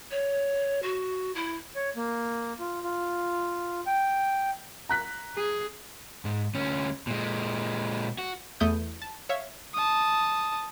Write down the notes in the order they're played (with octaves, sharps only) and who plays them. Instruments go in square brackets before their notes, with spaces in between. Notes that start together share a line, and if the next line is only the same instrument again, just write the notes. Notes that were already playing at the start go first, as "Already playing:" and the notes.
[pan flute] C#5
F#4
E4
[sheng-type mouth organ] C#5
A#3
F4
F4
G5
[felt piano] A#5 F#6 B6
[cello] G#4
[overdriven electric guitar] G#2
D2 C#4
A#2 G#3
F#4
[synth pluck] E2 A3 E4 D#6 G6
A5
C#5 E5 F5
[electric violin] A5 D#6